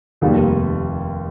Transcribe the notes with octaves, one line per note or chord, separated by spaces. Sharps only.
F1 D#2 D#3 G3